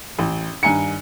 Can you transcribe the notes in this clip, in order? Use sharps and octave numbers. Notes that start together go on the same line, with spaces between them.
A1
G2 D#3 G#5 A#5 C#7